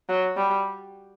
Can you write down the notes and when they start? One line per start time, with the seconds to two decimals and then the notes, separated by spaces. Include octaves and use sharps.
0.09 F#3
0.37 G3